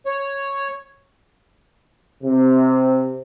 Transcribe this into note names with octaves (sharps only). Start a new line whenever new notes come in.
C#5
C3